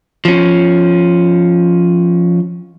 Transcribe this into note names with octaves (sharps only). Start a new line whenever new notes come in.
F3 C#4